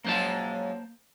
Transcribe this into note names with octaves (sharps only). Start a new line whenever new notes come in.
F#2 G#3 A#3 F4 C5 A5